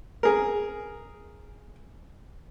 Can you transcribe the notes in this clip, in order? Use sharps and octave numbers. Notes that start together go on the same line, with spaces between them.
G#4 A#4